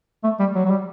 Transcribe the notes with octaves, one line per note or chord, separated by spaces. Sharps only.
A3
G3
F#3
F#3
G3